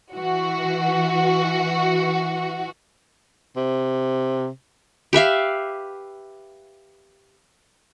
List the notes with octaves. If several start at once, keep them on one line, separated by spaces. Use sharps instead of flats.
E3 F#4
C3
G4 B4 E5 F5